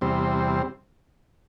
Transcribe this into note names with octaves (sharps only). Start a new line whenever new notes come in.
E2 C3 G3 C4